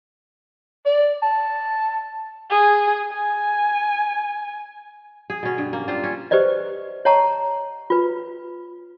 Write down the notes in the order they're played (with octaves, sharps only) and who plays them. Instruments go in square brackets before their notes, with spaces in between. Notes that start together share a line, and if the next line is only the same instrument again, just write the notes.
[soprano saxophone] D5
A5
[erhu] G#4
G#5
[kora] G#4
B2 C#4
G2
A#3
C4 D4 F4
C#4
[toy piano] G4 B4 C5 D5 D#5
C#5 D#5 F#5 A5 A#5 C#6
F4 B4